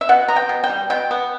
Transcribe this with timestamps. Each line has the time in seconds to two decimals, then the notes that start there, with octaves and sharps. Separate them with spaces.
0.01 E5
0.09 B2 F#5
0.28 B3 A#5
0.36 G5
0.49 B2
0.64 G5
0.70 G3
0.90 B2 G5
1.11 B3